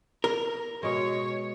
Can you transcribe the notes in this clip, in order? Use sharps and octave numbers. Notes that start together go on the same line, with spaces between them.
A#4
B2 G#3 C#5